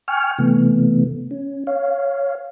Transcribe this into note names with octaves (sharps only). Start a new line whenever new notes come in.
G5 G#5 C#6 F6
C3 E3 A3 B3
C#4
C#5 F5